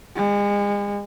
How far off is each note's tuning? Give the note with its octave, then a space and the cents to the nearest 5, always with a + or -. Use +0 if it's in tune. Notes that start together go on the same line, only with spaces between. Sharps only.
G#3 -35